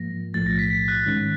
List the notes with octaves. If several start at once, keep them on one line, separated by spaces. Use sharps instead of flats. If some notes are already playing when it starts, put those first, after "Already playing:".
Already playing: G#2 F3 A#3 A#6
B1 A2 F3 A3 A6
A#6
B6
B6
F#6
A1 G#2 D#3 G#3 C#4